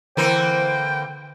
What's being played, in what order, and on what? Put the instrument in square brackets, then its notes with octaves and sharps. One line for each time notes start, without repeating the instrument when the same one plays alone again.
[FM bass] D3 [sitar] E3 A#3 C4 [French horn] C5 [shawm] G5